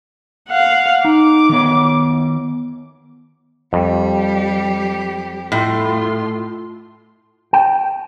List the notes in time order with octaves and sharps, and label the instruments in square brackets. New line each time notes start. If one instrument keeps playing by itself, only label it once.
[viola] F5 F#5
[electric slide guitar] D#4 [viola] D6
[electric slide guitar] D#3 B3 C#5
[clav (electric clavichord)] F2 [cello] G3 G4
[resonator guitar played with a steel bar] A2 [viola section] A3 F4 C6
[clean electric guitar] G5